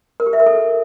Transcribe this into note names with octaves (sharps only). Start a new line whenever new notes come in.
A#4
G4
E5
A#4
A4